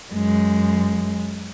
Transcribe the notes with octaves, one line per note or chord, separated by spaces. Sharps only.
F#2 G#3